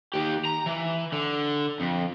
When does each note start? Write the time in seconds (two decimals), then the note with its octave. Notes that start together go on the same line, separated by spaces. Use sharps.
0.14 D#2 G4
0.45 A#5
0.66 E3
1.12 D3
1.80 F2